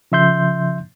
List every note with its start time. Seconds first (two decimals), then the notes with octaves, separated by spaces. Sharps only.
0.12 C#3 F3 E5 C6 G6